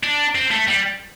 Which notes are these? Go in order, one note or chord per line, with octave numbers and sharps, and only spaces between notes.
D4
C4
A3
G3